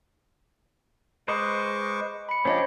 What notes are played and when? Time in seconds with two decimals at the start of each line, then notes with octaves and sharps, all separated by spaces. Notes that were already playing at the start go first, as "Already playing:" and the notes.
1.28 G#3 B4 C5 D#5 C#6 D6
2.29 B5 C#7
2.45 F3 C#4 D4 G4 C5 C#5 D#5